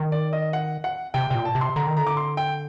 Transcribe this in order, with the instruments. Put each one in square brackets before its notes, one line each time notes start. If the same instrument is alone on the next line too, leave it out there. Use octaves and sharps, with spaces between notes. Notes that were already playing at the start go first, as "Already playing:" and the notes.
Already playing: [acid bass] D#3
[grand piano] D5
D#5
F#5
F#5
[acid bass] C3 [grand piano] G5
[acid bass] C3 [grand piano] G5
[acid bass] A#2
[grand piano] A5
[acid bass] C3
[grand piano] C6
[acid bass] D3 [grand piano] A#5
[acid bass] D#3
[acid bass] D3 [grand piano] A#5
[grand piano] D6
C6
G5